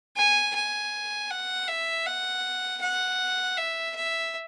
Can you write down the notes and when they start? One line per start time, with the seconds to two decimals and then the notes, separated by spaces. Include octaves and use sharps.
0.17 G#5
0.55 G#5
1.30 F#5
1.68 E5
2.06 F#5
2.81 F#5
3.57 E5
3.95 E5